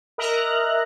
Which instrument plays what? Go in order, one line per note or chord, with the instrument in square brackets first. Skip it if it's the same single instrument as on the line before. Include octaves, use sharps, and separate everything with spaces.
[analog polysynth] A#4 D#5 E5 A#5 F#6